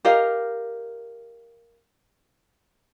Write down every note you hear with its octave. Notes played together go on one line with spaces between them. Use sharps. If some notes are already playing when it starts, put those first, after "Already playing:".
G4 A#4 D#5 F5